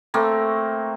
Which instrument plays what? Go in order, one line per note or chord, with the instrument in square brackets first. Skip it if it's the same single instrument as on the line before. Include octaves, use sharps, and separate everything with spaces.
[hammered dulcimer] A3 A#3 C4